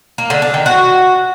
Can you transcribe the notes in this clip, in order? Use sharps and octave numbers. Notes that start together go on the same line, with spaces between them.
A#3
D3
D4
D#3
F#4